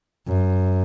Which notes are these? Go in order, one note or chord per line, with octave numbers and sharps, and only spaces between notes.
F#2